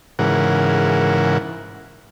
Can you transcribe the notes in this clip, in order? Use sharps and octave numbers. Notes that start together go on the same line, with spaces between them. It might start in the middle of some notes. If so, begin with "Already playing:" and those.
G#2 C#3 E3 A#4 F#5